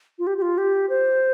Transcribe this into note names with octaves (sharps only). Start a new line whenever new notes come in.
F4
G4
G4
F4
G4
C5